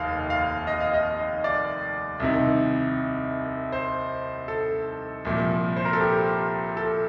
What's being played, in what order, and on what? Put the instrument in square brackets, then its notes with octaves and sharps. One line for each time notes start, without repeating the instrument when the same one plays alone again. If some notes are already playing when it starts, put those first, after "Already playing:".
Already playing: [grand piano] F1 D#2 D#3 F5
F5
D#5
F5
D#5
D5
C2 C3 D#3
C5
A4
C2 A#2 F3
C5
A#4
A4
G4
A4